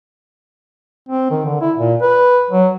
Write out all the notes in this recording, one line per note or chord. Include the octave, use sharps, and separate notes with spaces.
C4
D#3
D3
E4
A#2
B4
F#3